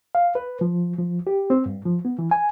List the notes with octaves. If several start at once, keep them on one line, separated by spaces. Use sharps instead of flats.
F5
B4
F3
F3
G4
C4
G2
F3
B3
E3
G#5